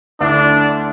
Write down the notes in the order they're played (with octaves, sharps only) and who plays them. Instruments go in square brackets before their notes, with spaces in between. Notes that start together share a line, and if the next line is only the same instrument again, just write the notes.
[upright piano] D2 D3 A3 E4 [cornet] D4